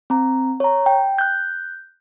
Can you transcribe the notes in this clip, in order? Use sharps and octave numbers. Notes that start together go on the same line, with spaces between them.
C4 A#5
C#5 A#5
G5
F#6 G6